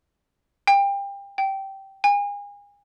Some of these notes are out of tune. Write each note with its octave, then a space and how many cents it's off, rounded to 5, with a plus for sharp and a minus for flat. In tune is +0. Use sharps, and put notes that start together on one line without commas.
G5 +25
G5 -15
G#5 -35